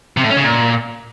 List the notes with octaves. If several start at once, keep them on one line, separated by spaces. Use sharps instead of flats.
C3
A2
C#4
C#3
A#2